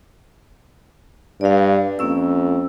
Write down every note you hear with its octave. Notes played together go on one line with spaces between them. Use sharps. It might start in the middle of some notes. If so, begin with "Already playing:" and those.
G2 D5 F5
F2 A#3 C#4 E6